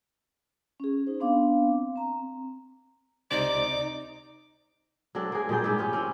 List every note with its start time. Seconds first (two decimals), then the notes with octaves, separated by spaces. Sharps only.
0.80 C#4 G#4
1.07 D#4 C5
1.20 B3 C4 D4 F5 D6
1.96 C4 A#5
3.31 C#2 C3 D#4 C5 D5 D6
5.15 F#3 C4 D4 A4
5.32 A#3 G#4
5.49 A#2 G3 G#4 G5
5.64 G#2 E4 G4 E5
5.78 F3 C#4 G4
5.93 C4 C#4 E4